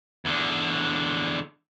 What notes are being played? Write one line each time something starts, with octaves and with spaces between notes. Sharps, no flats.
E2 D3